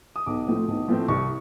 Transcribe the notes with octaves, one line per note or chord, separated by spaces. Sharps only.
D#6
B1 D6
A2 F3 A3 C4
B1
A2 F3 A3 C4
C2 C#6